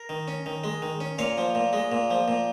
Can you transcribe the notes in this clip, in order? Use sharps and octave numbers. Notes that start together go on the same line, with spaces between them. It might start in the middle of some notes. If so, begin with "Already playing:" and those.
Already playing: A#4
D#3
C#4
D#3
G#3
D#3
C#4
A#2 C#5 F5
F3
A#2
G#3
A#2
F3
A#2